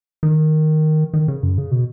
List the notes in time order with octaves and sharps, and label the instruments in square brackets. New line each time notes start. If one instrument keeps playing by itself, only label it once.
[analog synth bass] D#3
D#3
C#3
F#2
C#3
B2